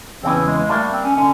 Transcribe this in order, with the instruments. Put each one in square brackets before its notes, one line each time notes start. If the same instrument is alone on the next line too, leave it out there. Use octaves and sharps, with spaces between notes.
[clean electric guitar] E2 C#3 E3 [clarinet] C4
[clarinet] G#3
G#3
[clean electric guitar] G3 A#3 D4 [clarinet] A3
[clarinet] C4
C#4
[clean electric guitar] D3 [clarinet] C#4